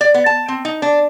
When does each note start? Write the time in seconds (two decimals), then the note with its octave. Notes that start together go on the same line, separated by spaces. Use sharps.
0.01 D5
0.14 B3
0.26 A5
0.48 C4
0.65 D#4
0.82 D4